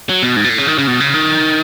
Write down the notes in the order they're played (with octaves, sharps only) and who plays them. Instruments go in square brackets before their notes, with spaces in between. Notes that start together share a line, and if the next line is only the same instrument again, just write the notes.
[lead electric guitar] F#3
B2
G#2
B2
A2
C#3
D#3
C#3
B2
C#3
D#3